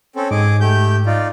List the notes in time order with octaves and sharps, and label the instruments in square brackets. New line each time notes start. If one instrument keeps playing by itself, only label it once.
[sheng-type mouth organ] C4 C#4 A4
[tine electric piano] G#2 [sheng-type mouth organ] G#4 D#5 D6
[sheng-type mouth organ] A3 G4 G6
D#4 F4 D5